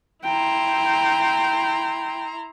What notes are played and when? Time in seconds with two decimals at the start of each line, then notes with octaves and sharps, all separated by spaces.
0.24 E4 G5 A#5 C6